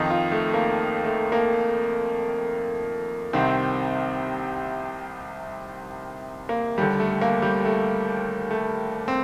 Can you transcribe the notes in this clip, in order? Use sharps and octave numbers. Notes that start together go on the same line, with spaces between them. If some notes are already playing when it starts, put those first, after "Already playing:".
Already playing: F2 D#3 D#4
F4
A3
A#3
A3
A#3
C2 C3 D#3 C4
A#3
D#2 D3 G3
A3
A#3
G3
A3
A3
C4